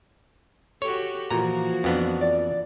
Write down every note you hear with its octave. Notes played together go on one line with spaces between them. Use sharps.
F#4 G4 A4 C#5
A#2 E3 F3 A#3 F#4 A#5
F2 B3 D4
D5